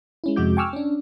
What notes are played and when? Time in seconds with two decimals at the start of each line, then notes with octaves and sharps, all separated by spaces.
0.24 G#3 C#4 E4
0.36 F2 C3 G#3 F#4 D6 G6
0.57 G5 G#5 C#6 D6 E6 F6
0.73 C#4 D4